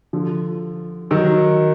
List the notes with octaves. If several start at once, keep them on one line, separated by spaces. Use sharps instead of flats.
D3 F3
D#3 F#3